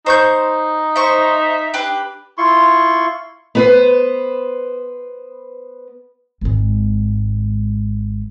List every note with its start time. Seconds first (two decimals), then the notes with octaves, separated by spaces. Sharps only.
0.06 D#4 C5 C#6 G6
0.96 C5 E5 C#6
1.74 D4 G4 B4
2.38 E4 F4 C6 C#6
3.55 B3 B4 C5
6.41 G#1 G#2